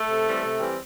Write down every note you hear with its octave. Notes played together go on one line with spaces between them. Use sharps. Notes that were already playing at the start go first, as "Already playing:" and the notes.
Already playing: A3 A4
C3
E3 G3 C4
C3
E3 G3 C4